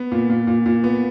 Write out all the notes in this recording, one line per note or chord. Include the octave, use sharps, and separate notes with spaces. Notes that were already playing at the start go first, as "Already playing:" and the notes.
Already playing: B3
A#2
A#2
A#2
A#2
B3